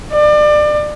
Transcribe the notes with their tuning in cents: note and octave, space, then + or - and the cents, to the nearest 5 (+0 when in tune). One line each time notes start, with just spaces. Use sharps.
D5 +30